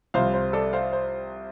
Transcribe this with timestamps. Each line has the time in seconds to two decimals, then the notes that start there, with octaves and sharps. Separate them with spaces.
0.14 C2 C3 F3 C5 F5
0.34 C5
0.53 A4 D5
0.73 C5 F5
0.93 C5